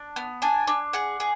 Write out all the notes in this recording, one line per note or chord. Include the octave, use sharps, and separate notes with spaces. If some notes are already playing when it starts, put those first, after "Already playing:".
Already playing: D4
B3
D4 G#5
D4
G#4 F#5
G#4